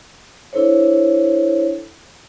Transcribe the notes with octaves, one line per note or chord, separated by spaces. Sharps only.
D4 E4 A4 C5 C#5